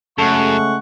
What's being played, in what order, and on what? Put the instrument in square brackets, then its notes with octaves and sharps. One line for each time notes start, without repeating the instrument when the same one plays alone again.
[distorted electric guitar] F#2 [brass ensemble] C#3 G#3 A3 [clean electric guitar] A4 [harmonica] F#5 C#6